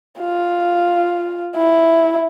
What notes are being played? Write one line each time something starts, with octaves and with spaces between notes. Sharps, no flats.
F4
E4